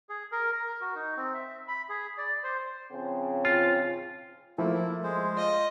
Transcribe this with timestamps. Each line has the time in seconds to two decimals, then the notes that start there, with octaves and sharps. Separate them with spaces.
0.09 G#4
0.32 A#4
0.52 A#4
0.81 F#4
0.95 D#4
1.17 C4
1.34 E5
1.68 B5
1.89 G#4
2.18 D5
2.44 C5
2.91 C#3 F3 C4
3.45 F4
4.58 F3 A3 A#3 E4 E5
5.03 G#3 C5
5.37 F4 D#5